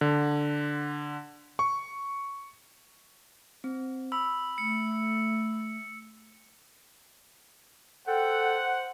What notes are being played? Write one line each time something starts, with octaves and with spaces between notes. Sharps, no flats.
D3
C#6
C4
B5 E6
A3 C#7
A4 C5 F#5 G5